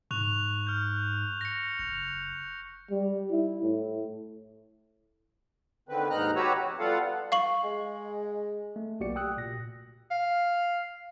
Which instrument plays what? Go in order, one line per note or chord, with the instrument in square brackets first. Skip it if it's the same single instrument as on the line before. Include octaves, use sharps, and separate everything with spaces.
[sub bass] G#2 [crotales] C#6 F#6 F7
[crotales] F6 G6
A#6 C#7
[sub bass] F#1 [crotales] F7
[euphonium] G3
E4
A2
[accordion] D3 D#3 C4 B4
D#2 G#2 D#4 A#5 F6 F#6
F#4 G4 B4 C#5 A#5 E6
F2
G3 B3 F4 A4 F5 F#5
[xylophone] F5 C#6 F#7
[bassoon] G#3
[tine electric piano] A3
B1 A#3 F#4 G4 D5 C#7
G5 D#6 E6 F#6
A#2 A#6
[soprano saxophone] F5